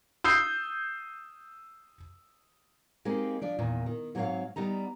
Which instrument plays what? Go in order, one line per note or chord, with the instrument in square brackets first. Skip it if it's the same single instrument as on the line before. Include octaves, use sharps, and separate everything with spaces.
[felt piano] D#6 E6 G6 C7
[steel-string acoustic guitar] G#3 A#3 C4 D#4 G4
F3 D4 D5
E2 A#2 D#3
D#3
G#2 F#3 B3 C4 C#5 F5
G3 B3 D#4 A#5